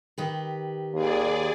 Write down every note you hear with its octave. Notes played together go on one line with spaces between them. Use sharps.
D#3 G4 B4
D#2 G#4 D5